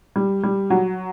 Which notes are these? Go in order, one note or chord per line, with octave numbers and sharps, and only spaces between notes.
G3
G3
F#3